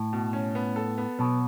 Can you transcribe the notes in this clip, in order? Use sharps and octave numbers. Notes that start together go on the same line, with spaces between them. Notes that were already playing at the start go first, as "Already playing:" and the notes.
Already playing: A2
B2
C#4
B3
A4
B3
B2 F#3